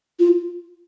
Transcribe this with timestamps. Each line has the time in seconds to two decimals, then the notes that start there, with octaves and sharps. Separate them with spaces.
0.19 F4